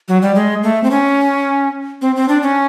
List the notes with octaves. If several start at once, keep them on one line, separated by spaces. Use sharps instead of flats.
F#3
G3
G#3
A3
C4
C#4
C4
C4
D4
C#4